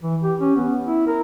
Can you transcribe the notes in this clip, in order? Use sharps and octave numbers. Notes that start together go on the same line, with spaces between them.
E3
G4
C#4
B3
E4
A#4